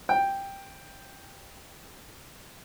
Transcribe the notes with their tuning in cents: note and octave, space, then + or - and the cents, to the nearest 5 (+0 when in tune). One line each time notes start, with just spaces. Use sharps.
G5 +5